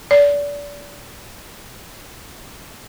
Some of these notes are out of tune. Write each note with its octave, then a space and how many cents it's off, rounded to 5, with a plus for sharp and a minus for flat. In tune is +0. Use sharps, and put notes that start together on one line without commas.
D5 -30